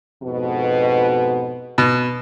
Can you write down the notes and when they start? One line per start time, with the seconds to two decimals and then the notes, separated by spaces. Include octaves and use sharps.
0.23 F2 G#2 B2
1.78 B2